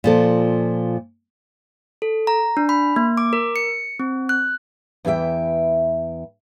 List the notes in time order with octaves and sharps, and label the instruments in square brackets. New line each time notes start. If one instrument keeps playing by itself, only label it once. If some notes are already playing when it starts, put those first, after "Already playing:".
[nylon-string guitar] A#2 F3 A4
[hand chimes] A4
A#5
D4
B5
A#3
D6
A#4
C#7
C4
F#6
[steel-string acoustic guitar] E2 E3 G#4 E5 G5